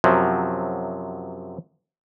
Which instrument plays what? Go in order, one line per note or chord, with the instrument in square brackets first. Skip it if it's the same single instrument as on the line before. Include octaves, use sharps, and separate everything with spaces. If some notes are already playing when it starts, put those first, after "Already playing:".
[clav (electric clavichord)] F#2 C3 F3 F#3